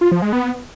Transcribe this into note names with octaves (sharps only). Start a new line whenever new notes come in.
F4
F3
G#3
B3